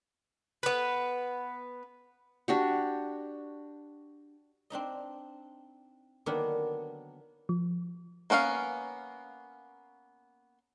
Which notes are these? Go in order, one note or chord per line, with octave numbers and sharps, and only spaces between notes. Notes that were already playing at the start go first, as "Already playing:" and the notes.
B3 B4
D4 F#4 G4
C4 D4 D#4 D#5
D3 D#3 F#3 A#3 B3 D4
F3
A#3 B3 C#4 A4 F5